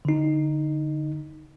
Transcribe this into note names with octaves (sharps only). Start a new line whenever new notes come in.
D3 D#4